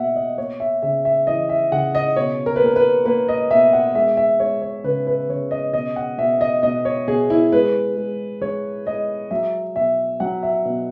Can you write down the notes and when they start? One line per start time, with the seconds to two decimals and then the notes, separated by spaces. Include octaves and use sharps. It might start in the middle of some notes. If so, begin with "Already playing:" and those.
Already playing: B2 A#3 E5 F#5
0.15 D#5
0.38 A#3 C#5
0.60 E5
0.82 C#3 E5
1.05 E5
1.27 E3 D#5
1.49 E5
1.72 C#3 F#5
1.95 D#5
2.16 B2 C#5
2.46 A#4
2.56 B4
2.61 A#3 A#4
2.76 B4
3.05 A#3 B4
3.28 D#5
3.50 B2 E5
3.73 F#5
3.95 G#3 E5
4.17 E5
4.40 G#3 C#5
4.62 C#5
4.84 C#3 B4
5.07 B4
5.29 C#3 C#5
5.51 D#5
5.73 B2 D#5
5.96 F#5
6.18 B2 E5
6.41 D#5
6.63 B2 D#5
6.85 C#5
7.08 B2 G#4
7.30 E4
7.52 G#3 B4
7.97 G#3
8.42 G#3 C#5
8.86 G#3 D#5
9.31 F#3 E5
9.76 B2 E5
10.20 F#3 F#5
10.43 E5
10.65 B2